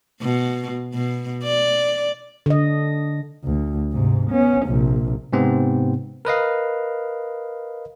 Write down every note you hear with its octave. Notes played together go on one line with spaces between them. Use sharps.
B2
B2
D5
D3 D#5
D2
G#2 C3
B3 C#4
A#1 C3
G#2 C3 B3 C4
A#4 B4 D#5 F5